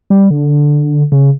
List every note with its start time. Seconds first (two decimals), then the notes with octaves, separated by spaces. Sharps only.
0.10 G3
0.31 D3
1.12 C#3